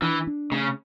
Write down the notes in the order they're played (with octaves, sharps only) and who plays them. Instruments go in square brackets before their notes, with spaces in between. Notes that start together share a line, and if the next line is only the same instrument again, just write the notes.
[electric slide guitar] E3 [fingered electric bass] D4
[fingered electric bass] D4
[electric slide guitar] C#3 [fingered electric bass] A3